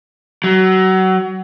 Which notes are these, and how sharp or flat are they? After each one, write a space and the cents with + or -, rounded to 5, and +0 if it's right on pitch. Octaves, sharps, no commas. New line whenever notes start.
F#3 +25